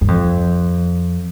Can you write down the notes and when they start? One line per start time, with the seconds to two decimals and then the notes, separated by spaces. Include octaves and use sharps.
0.01 G2
0.08 F2